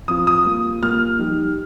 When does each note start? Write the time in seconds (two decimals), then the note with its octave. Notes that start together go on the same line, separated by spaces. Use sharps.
0.08 F3 C4 F4 D#6
0.27 D#6
0.45 G3 A#3 F4
0.83 G3 A#3 F4 F6
1.19 F3 D#4 G4